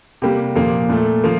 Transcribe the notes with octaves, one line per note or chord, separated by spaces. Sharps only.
C3 G3 A#3 G4
A#2 F3 A#3
A#2 A3
F3 A#3